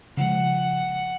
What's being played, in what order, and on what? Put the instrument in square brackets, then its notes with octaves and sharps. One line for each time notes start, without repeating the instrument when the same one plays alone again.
[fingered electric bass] C#3 F3 G#3 [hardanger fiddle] F#5